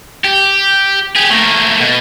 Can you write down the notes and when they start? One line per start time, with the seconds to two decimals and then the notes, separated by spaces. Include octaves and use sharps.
0.25 G4
1.16 G4 G#4
1.30 A3 A#3
1.80 B2